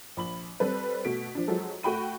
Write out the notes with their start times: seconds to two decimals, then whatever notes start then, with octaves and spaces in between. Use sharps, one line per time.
0.17 A#1 B5 F#7
0.60 G3 C4 A4 B4
1.05 B2 A3 B6 D7
1.35 F3 D4
1.48 F3 F#3 G#3 A4
1.83 A3 F#4 G5 B5 D#7